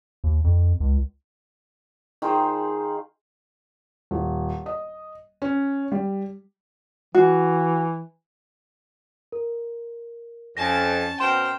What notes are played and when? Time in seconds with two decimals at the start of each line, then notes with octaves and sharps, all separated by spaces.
0.24 D#2
0.44 F2
0.80 C#2
2.22 D#3 F4 G#4 C5
4.11 D#1
4.66 D#5
5.42 C#4
5.92 G3
7.15 E3 F#4
9.32 A#4
10.57 F2 C#4 G#5 A5 A#6
11.20 B2 C4 A#4 G5 C6 E7